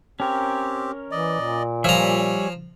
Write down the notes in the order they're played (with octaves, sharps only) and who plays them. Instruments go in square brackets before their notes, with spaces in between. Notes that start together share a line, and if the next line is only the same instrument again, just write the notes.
[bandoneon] C4 G4 [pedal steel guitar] C#4 A#4 C#5
[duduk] E3 [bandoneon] D5 D#5
[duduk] A#2
[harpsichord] F3 A#5 [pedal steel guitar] G3 E5 [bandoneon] C#5 G#5